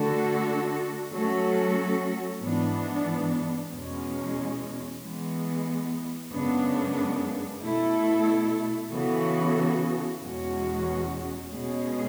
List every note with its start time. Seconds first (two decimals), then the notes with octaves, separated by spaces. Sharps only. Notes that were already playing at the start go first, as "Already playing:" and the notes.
Already playing: D3 A3 D4 F#4 A4
1.12 F#3 A3 C#4 F#4 A4
2.42 G#2 E3 B3 D4
3.71 E2 B2 G#3 C#4
5.02 E3 G#3 B3
6.31 F#2 C#3 G#3 B3 D4
7.62 B2 A3 E4 A4
8.92 C#3 E3 B3 F#4 A4
10.22 E2 B2 G#3 C#4 F#4
11.51 B2 G#3 C#4 G#4